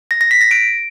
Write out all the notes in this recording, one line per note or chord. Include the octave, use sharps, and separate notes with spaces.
A#6
A#6
B6
A#6
D7